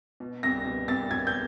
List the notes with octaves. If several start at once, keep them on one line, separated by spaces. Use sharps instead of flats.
B2
C2 A#6
B2
C2 A6
B2 G#6
G6